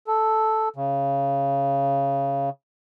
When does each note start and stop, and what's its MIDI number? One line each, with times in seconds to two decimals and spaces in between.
0.07 0.69 69
0.76 2.50 49